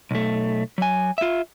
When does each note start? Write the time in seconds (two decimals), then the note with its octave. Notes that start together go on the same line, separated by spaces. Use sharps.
0.11 B1 A3
0.78 F#3 G#5
1.18 F4 E5